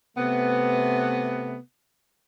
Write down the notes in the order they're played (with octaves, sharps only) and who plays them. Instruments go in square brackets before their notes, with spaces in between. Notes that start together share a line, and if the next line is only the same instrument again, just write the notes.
[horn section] C3 A3 B3